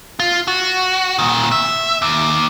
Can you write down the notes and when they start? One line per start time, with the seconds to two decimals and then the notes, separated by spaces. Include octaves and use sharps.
0.20 F4
0.48 F#4
1.19 A#2 D#3
1.52 E5
2.02 D#2